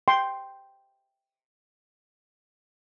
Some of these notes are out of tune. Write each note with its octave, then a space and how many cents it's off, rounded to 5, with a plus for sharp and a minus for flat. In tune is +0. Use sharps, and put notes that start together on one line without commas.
G5 +0 C6 +0